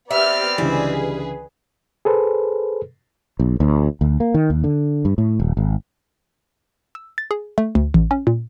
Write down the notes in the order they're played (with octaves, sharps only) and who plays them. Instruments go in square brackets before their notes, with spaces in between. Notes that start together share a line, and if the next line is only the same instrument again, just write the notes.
[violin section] B3 G4 F6 [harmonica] C4 D5 B5 [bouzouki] E5
[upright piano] C#2 D3 E3 [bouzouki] G3 [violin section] G#4 B4
[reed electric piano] G#4 A4 B4 C5
[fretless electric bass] B1
D2
D2
A#3
D#3
D#2
D3
G2
A2
D#1
G#1
[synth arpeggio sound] E6
A6
G#4
A3
D2
A1
C#4
A#2